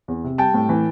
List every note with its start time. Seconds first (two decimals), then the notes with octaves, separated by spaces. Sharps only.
0.08 E2
0.24 C3
0.38 G3 G5 A5
0.54 A2
0.69 E3